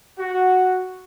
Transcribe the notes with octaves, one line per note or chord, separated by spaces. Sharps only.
F#4